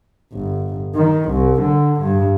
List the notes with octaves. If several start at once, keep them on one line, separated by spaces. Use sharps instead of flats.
G1
D#3
C2
D3
G2